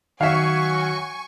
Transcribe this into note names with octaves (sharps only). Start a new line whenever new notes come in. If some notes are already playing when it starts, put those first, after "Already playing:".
D#3 F#3 E5 F5 G#5 C#6